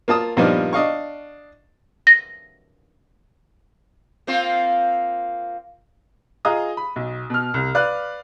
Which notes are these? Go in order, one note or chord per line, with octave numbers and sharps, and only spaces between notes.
A#3 F4 A5 D#6
G2 A#2 F3 B3 D4 D#4
D4 D#5 F5 C#6
A#6
A#3 C4 F4
F4 G#4 D#5 A#5 D#6
B5
B1
B2 F6
C2
B4 D5 F5 F#6